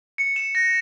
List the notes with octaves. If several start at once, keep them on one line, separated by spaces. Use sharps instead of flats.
C#7
E7
A#6